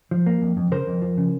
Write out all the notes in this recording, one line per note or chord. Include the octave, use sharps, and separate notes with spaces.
F3
A#3
F2
F2
C#3 A#4 C5
F2
F3
C#3